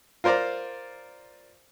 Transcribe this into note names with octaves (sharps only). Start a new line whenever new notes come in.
F4 A#4 C5 D5 A#5